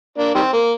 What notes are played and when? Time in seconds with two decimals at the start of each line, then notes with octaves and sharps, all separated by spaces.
0.18 A#3 D4
0.35 D#3 G3 C4
0.53 A#3